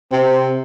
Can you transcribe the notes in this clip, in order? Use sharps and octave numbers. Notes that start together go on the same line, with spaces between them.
C3 C4